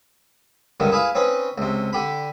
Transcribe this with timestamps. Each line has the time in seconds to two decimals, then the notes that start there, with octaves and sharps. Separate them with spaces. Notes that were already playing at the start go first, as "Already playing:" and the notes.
0.80 C#2 G2 D3 D#3
0.92 E4 G#4 B4 F5
1.15 C4 C#4 D#4 B4
1.58 C#2 C3
1.93 D3 G4 B5